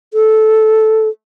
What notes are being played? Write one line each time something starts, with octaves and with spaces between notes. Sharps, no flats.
A4